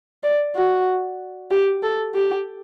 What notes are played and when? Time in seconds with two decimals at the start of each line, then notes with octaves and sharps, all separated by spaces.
0.23 D5
0.56 F#4
1.51 G4
1.83 A4
2.14 G4